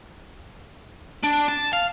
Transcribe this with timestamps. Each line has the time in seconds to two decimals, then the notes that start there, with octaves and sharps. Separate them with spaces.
1.23 D4
1.48 A5
1.73 F5